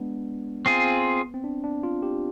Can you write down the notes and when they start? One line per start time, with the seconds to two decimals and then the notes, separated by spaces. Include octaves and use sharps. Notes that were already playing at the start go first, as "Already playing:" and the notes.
Already playing: G#3 B3 D4
0.66 C4 F4 G#4
1.34 C4
1.44 D4
1.64 D4
1.83 F4
2.03 G4